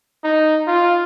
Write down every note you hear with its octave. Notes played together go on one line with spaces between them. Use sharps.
D#4
F4